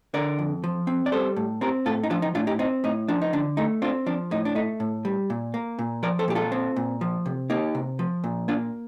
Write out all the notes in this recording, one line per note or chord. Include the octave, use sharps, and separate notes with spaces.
D3 A#4 D5
F2
F3
C4
D5
G3 A4 C5
A2
C4 G4 A#4
A2 F4 A4
D#4
F3 D4 F4
D#4
A2 D4 F4
D#4 G4
C4 D#4
A2 D#4
F3 D4
D#4
D3 D4
A3 D#4
C4 D4 F4
F3 D4
A2 D#4
D4
A3 D#4
A2
G3
A#2
A#3
A#2
F3 A#4 D5
A4 C5
A#2 G4
F4 A4
C4
A#2
F3
C3
A#3 D#4 G4
C3
F3
A#2
A#3 D4 F4